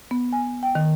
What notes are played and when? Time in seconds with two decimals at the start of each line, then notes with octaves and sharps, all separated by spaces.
0.11 B3
0.33 G#5
0.63 G5
0.75 D#3